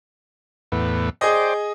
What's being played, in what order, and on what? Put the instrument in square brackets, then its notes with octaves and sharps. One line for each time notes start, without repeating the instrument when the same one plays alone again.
[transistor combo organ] E2 A2 B3
[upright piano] G#4 D#5 [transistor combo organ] C5 D5 G5